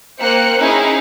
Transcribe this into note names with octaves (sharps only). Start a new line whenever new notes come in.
A#3 C5 G5 F#6 C#7
C#4 D#4 E4 G#4 G#5 A#5